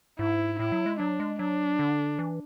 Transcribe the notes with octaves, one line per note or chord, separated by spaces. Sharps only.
G#2 E4
A2 E4
F#3
G#3
F#3 D4
G#3
F#3 D4
D3
E3